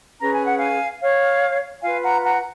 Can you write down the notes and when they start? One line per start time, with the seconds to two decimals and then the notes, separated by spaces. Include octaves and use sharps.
0.20 C#4 G#4 B4 A#5
0.33 G#5
0.45 F#5
0.58 F5 G#5
1.01 C#5 F5
1.83 F4 B4 F5 G#5
2.03 F#5 A#5
2.23 F#5 A#5